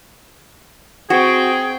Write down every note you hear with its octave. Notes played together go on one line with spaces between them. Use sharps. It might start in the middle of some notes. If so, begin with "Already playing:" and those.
C4 F#4 G#4 G5